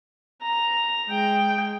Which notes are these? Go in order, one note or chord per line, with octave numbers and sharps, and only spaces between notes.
A#5
G#3 G5